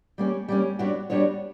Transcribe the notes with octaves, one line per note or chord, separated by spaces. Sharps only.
G3 A#3 C#4
G3 A#3 C#4
G3 B3 D4 F#4 C#5
G3 B3 D4 F#4 C#5